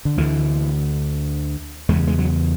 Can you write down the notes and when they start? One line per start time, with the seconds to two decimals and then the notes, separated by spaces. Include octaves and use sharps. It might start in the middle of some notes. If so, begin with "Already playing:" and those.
0.05 D3
0.17 D2 D3 E3
1.89 E2 G#3
1.93 C#3
2.08 G#3
2.19 F#3